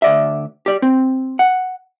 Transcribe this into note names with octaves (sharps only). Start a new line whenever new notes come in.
D2 D5 E5
G4 D5
C4
F#5